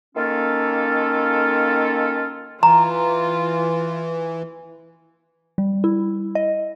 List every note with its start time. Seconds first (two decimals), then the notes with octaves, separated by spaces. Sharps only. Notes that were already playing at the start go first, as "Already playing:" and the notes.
0.15 D#3 A#3 C#4 F4 A4
2.63 E3 F4 A#5
5.58 G3
5.84 E4
6.35 D#5